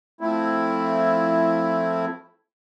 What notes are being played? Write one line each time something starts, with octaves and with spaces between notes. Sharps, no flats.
F3 A3 C4 E4